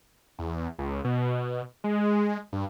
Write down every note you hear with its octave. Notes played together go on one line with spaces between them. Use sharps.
E2
C#2
B2
G#3
G2